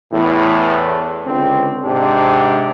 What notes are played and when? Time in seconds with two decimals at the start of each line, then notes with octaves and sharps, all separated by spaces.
0.12 E2 A2
1.26 C#2 D3 C4
1.83 G#2 C3 D4 G4